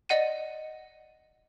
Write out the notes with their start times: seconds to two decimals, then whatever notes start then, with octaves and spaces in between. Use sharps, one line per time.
0.09 D5 D#5 F#5 D#7